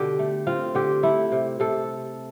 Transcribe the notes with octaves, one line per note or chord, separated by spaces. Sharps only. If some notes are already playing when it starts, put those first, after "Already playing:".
Already playing: B2 D3 D4 G4
A3
C4 F4
D3 G4
A3 E4
C3
C3 A4